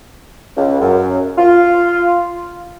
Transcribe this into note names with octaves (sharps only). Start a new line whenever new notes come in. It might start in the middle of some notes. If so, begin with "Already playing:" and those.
C#2
F#2
F4